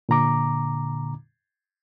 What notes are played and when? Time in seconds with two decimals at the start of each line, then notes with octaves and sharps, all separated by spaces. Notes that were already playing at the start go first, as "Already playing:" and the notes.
0.09 A#2 D3 A#5 D6